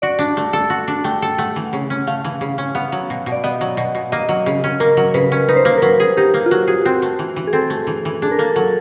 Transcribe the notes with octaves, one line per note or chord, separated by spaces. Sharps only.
F#4 D5
D4
A3
A4
F#4
D4
A3 G5
A4
A3 F#5
E3
C#3
C#4
A3 F5
E3
C#3
C#4
B3 F5
F#3
B2
B2
D5
B3 D#5
F#3
B2
B2
A#3 D#5
F#3
C#3
C#4
A#3 A#4
F#3
C#3 B4
C#4
D#4 B4
C5
A#3 B4
A#4
F#3 B4
G#4
D#4 G4
A#3
F4
F#3 F#4
G#4
C4 F#4
A3
E3
E3
G#4
C4 A4
A3
E3
E3
D4 G#4
A#4
A#3 A4
F#3 A4